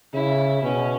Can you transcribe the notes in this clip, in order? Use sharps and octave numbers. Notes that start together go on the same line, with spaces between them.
C#3 E4
B2 C#4